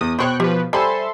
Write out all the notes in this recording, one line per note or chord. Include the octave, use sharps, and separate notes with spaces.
E2 D#6
B2 B3 C5 C#5 G5 C#6 F#6
F3 G4 B4
G3 A4 C5 E5 G#5 B5 C6